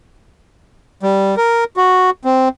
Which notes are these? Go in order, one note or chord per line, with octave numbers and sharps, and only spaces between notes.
G3
A#4
F#4
C4